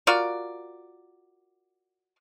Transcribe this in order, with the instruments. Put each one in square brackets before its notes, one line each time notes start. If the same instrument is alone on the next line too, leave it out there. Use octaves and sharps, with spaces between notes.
[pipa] F4 F#4 A#4 D5